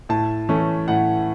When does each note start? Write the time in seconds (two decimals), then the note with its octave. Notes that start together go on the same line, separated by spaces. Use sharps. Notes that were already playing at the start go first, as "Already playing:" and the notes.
0.09 A2 A5
0.49 E3 A3 C#4
0.88 A2 F#5